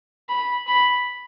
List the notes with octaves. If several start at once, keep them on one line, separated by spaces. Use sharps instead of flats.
B5
B5